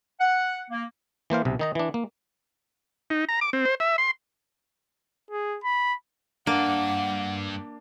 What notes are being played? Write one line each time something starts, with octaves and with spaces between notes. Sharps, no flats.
F#5
A#3
E3 A#3 C5 F5
B1 C3
D#3 D#4 A#5
E3 D4
A#3
D#4
A#5
D6
C4
C5
E5
C6
G#4
B5
G2 A#3 D4 D5 F#5